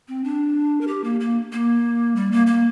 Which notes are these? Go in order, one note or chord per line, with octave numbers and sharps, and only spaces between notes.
C4
D4
A#4
G4
A#3
A#3
A#3
G3
A#3
A#3